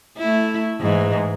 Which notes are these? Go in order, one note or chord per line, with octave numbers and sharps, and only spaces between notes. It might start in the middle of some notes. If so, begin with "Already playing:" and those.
A3 E4
G#2 E3